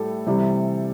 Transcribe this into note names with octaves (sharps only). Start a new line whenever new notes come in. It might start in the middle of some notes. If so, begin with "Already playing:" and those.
Already playing: A2 G3 A4
C3 E3 G3